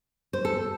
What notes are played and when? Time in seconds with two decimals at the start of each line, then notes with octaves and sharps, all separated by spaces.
0.33 C5
0.45 A4